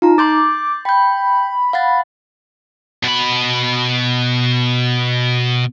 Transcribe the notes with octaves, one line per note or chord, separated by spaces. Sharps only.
D#4 F4 A#5
C6 D6 G6 A6
G5 B5 G6
F5 F#5 A6
B2 B5